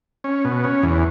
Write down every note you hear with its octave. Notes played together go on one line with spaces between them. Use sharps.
C#4
B2
C#4
E2